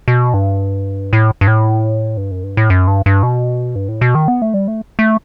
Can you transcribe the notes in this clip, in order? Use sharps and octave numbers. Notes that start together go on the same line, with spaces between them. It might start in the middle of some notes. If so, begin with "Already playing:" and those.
B2
G2
A2
G2
A2
G2
F#2
G2
A2
F#2
G2
G2
B2
G2
A2
B2
D#3
B3
A3
G3
A3
A3